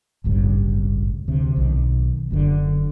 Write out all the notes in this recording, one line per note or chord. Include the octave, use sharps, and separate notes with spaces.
D1 G#1 G2 C#3
D2 C3
B1 D#3
F#1 F#2 A#2 D3